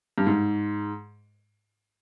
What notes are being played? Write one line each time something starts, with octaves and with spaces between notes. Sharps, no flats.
G2
G#2